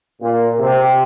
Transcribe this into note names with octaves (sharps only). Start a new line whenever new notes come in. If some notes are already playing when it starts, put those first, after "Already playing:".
A#2
C3